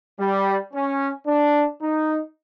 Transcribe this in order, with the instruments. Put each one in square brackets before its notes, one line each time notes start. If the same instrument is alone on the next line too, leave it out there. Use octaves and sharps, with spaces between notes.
[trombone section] G3
C#4
D4
D#4